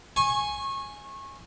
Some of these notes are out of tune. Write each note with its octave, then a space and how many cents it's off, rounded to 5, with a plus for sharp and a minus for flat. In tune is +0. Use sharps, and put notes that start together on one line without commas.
G#5 +0 C#6 -25